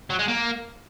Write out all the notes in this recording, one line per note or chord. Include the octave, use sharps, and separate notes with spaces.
F#3
G#3
A#3